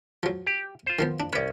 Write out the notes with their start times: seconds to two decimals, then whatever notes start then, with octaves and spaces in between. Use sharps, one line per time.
0.23 F3 F#3
0.47 G4
0.86 F4 C5
0.99 D#3 F3 B3
1.20 D4
1.33 C2 C#4 B4 D5